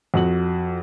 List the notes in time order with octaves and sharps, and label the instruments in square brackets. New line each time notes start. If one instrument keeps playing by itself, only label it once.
[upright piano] F2 F#4 F#7